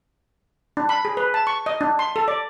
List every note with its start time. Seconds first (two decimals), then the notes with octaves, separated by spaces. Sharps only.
0.77 D4
0.89 B5
1.05 G#4
1.17 B4
1.34 A5
1.47 C#6
1.66 D#5
1.81 D4
1.99 C6
2.16 A4
2.28 D5